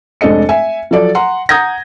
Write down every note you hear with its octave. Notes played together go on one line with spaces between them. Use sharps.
F1 G#3 D4 A4 D#5 C#7
E5 G#5
F3 F#3 A4 D5
F#5 A#5 C6
F#5 A#5 D#6 G6 G#6 A#6